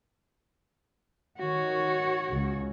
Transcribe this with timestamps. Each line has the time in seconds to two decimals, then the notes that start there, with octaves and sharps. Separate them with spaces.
1.39 D#3 F#4 C#5
2.29 C#2 C#3